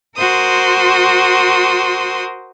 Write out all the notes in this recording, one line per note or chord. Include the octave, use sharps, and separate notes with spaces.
F#4 A#4 C5 C6 D#6